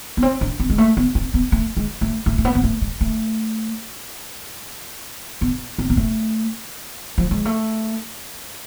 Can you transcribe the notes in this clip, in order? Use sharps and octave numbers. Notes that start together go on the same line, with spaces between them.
B3
C4
D4
C4
G#3
A3
B3
C4
B3
A3
G#3
A3
A3
A3
B3
B3
A3
G#3
A3
B3
C4
B3
A3
F3
G#3
A3